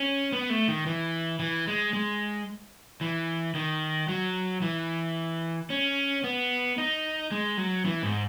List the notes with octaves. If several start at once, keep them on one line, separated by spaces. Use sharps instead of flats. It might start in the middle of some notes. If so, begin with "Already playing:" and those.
Already playing: C#4
B3
A3
D#3
E3
E3
G#3
G#3
E3
D#3
F#3
E3
C#4
B3
D#4
G#3
F#3
E3
G#2